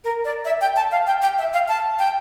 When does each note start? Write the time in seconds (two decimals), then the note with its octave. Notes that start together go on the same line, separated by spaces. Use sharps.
0.04 A#4
0.25 D5
0.45 E5
0.61 G5
0.76 A5
0.91 F5
1.07 G5
1.22 G5
1.38 E5
1.53 F5
1.68 A5
1.99 G5